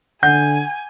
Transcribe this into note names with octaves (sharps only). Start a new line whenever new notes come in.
D3 F#5 G#5 G6